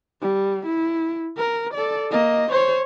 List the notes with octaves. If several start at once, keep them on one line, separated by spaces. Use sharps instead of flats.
G3
E4
A#4
A4 D5
A#3 D#5
C5 C#5